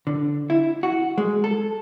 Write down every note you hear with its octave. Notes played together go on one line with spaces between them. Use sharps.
D3
E4
F#4
G#3
A4